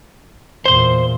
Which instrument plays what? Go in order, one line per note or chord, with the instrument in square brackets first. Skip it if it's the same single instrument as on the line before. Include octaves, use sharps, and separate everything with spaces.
[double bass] E2 A#2 [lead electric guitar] C5 C6